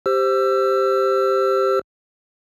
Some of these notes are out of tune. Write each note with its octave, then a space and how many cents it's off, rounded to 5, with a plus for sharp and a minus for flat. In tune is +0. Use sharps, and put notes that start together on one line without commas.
G4 +0 C5 +0 E6 +30